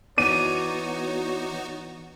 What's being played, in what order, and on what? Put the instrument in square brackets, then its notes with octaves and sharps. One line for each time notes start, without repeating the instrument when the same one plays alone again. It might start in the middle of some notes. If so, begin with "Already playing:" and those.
[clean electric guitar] E3 D5 [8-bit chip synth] B3 D#4 F#4 [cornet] C#5 [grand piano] D#7